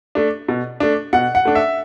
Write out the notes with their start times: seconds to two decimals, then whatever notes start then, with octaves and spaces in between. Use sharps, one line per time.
0.15 A3 D4
0.48 B2
0.80 A3 D4
1.13 B2 F#5
1.35 F#5
1.45 A3 D4
1.55 E5